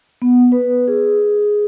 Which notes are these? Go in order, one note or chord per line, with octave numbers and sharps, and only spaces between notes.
B3
B4
G#4